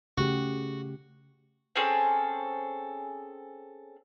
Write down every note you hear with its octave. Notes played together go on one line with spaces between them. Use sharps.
C#3 A3 F#4 G4
C4 C#4 G#4 A4